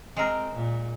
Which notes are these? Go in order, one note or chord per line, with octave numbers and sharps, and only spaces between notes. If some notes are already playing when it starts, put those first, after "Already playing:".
G#3 C4 A#4
A#2